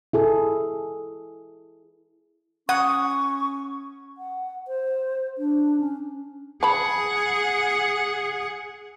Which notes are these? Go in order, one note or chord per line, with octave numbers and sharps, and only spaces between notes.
E4 G#4 A4
C#4 F#5 C#6 D#6
F#5
C5
D4
C#4
G#4 F#5 A5 B5